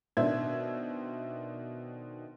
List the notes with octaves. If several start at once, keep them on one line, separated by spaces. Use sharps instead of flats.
B2 D#3 D4 C5 E5 G#6